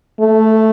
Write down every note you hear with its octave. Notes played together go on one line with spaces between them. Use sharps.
A3